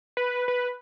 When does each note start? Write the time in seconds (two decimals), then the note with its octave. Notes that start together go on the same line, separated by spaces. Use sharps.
0.17 B4
0.48 B4